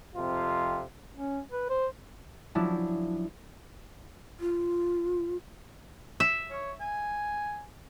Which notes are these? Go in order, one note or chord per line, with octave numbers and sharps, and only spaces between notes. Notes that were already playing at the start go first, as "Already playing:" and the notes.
F2 C3 F4
C#4
B4
C5
F3 F#3 C#4 D4 E4
F4
E5
C#5
G#5